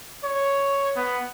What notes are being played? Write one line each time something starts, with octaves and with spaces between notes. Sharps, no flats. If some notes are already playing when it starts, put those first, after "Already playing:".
C#5
B3